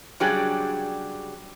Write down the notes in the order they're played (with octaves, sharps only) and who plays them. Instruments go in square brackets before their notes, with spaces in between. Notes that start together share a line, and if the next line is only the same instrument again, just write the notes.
[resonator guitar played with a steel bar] C#3 F#3 G3 D4 G4 G#4